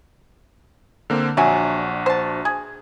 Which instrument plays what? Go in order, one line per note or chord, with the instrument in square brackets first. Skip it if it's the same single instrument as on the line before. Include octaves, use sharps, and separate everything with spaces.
[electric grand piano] D3 A#3 C4
[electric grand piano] A#1 D4 F#4 [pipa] F#3 E5 G#5
[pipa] C5 A5
G#4